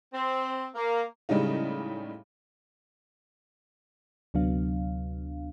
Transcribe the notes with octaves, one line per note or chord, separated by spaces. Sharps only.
C4
A#3
A2 C#3 G3 G#3 C#4 D#4
D2 C3 F#3 B3 D4 F5